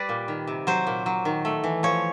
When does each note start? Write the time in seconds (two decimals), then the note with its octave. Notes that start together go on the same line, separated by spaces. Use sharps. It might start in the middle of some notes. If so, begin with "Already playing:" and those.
Already playing: G3 B4 D5
0.09 A#2
0.28 D#3
0.47 C3
0.67 F#3 C5
0.87 A#2
1.06 F#3
1.25 D#3
1.45 A3
1.64 E3
1.83 F3 C#5